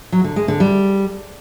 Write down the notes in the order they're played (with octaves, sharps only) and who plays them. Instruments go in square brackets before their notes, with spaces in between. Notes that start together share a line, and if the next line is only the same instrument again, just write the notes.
[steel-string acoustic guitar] F#3
D3
G#3
D3
G3